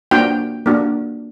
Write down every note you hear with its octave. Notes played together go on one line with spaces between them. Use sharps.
A#3 D4 F#4 G5
A#3 D4 F#4